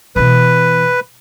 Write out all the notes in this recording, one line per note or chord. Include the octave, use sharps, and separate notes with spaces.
B2 E3 B4